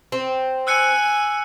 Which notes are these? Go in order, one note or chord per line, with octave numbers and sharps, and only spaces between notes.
C4
G#5 E6 F#6 C#7